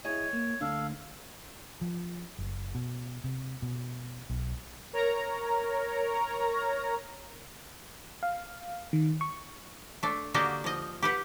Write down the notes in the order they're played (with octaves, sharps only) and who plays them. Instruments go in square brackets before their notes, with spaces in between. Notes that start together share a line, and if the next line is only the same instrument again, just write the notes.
[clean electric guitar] E4 G#4 D#5 [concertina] C#5
[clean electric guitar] A#3
[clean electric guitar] D2 D4 [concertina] A4 F5
[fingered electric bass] F3
F#1
B2
C3
B2
B1
[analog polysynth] A#4 C#5 A#5
[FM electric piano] F5
D#3
C#6
[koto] A3 D4
D3 A#3 D4 F#4 G4 D#5
F3 D#5
G4 B4 F#5